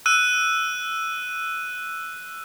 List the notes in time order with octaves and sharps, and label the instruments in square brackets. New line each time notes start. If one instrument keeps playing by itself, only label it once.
[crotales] E6 F#6 D#7